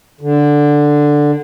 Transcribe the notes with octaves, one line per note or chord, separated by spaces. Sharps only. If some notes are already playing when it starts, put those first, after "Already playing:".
D3